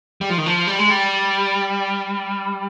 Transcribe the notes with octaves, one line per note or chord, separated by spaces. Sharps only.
G3
F3
D#3
F3
G3
G#3
G3